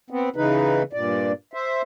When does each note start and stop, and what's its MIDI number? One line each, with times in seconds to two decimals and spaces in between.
0.10 0.29 59
0.10 0.29 60
0.36 0.83 49
0.36 0.83 52
0.36 0.83 63
0.36 0.83 71
0.93 1.32 43
0.93 1.32 46
0.93 1.32 74
1.54 1.82 72
1.54 1.82 76